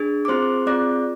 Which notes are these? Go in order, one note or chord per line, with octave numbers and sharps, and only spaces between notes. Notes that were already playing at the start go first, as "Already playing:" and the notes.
Already playing: D4 G#4
D6
C4 F4 G#4 C5 C6
C4 F4 G#4 D5 D6